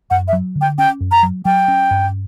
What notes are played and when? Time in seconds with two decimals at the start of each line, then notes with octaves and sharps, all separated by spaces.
0.10 F#2 F#5
0.28 E5
0.33 F#3
0.56 D3
0.61 G5
0.78 C#4 G5
1.01 F#2
1.12 A#5
1.23 F#3
1.45 F#3 G5
1.68 C#4
1.91 G2